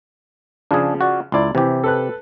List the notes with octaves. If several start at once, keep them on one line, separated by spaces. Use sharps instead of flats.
C#3 F3 D4 G#4
F#4 D5
C#2 E4 D5 C6
C3 E3 G4
A4 B4 F#6